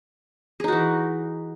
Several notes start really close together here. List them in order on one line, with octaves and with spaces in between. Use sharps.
G#4 D#4 F#4 E3